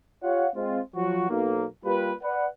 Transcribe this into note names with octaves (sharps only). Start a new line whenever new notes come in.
F4 G4 C#5 F5 F#5
G#3 C4 F4
F3 F#3 F#4
B1 A#3
G3 A#3 F4 G4 B4
B4 D5 F#5